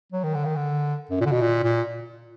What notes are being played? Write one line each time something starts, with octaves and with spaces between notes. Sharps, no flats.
F#3
D#3
D3
D#3
D3
F#2
A#2
D3
B2
A#2
A#2